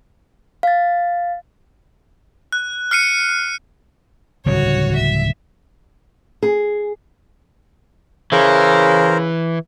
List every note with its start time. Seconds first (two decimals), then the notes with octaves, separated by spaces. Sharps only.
0.63 F5 A6
2.52 F#6
2.91 F6 C7 C#7 D#7
4.46 D1 C#3 G3 F#4 C#5
4.96 E5
6.43 G#4
8.32 C#3 E3 A#4 C5